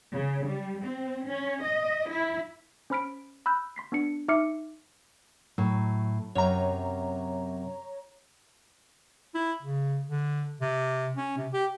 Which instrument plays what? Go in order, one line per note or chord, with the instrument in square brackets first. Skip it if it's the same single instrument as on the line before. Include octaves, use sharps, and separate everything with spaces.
[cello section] C#3
G3
C4
C#4
D#5
E4
[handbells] C#4 C5 B5 F6 B6 D7
B5 E6 F#6 G6
C6 B6 C7
B3 D4 C#7
D#4 E5 D6 F6 C7 C#7
[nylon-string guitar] A2 [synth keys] F#3
[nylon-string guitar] F#2 C3 [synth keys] C#5 A#5
[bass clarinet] E4
C#3
D3
C3
C#4
C3
G4